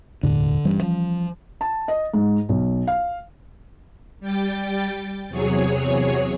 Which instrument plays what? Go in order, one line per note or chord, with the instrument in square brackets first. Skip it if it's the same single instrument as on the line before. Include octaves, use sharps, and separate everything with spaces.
[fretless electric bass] E1 D2 A2 [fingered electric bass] D3
[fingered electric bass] G2 [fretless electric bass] E3 G3 C#4
[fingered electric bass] F3
[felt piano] A5
D#5
G#2
B1
F5
[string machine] G3 G5 A6
E2 C3 F#3 G#4 C#5